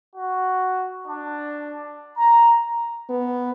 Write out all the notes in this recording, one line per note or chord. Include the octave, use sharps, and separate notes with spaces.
F#4
D4
A#5
B3